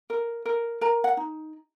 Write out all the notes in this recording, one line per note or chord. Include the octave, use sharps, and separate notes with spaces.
A#4
A#4
A#4 A#5
F#5
D#4